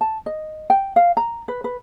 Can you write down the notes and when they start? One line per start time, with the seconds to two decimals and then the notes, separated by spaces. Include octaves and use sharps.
0.01 A5
0.26 D#5
0.70 G5
0.96 F5
1.17 A#5
1.48 B4
1.64 B4